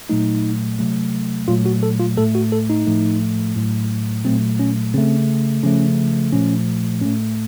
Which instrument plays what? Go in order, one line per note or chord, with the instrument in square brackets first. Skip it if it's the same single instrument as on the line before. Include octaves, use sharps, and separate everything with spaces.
[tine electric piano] A#2 F#3 A3 D#4
C3 F#3 A3
A#2 F#3 A3 F4
F#4
A4
F4
A2 A3 A4
F#4
A4
D#4
A2 F3 A3
A2 F#3 A3
A#2 F#3 A3 C4
C#4
C#3 A3 C4
C#3 F3 A3 C#4
A#2 F3 A3 C#4
A2 A3 C#4